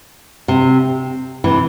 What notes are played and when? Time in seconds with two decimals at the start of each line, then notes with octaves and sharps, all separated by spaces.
0.48 C3
1.44 C3 E3